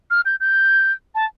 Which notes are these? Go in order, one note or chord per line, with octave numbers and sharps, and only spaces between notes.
F6
G6
G6
A5